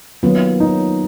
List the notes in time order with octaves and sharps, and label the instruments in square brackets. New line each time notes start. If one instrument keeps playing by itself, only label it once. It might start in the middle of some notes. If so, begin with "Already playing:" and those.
[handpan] D#3 F#3 A#3 F4 [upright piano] B3
[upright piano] D#4